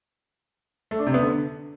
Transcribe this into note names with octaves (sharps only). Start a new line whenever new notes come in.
A3
D4
C3
B3
D3